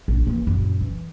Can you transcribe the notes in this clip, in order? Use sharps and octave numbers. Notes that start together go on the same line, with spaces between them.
A#1
E3 A#3
F#2 A#2
E3